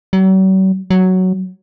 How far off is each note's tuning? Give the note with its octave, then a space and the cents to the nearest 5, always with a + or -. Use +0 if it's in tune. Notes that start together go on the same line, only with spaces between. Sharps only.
F#3 +45
F#3 +5